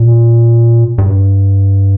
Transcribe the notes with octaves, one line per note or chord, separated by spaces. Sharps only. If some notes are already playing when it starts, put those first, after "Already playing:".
Already playing: A#2
G2